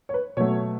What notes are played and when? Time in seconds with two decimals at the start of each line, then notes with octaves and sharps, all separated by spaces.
0.09 C#5
0.14 B4
0.37 B2 F#3 A3 C#5